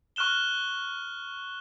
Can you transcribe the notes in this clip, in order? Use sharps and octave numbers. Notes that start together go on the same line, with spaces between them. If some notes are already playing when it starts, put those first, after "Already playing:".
C#6 F6 F#6 E7 G7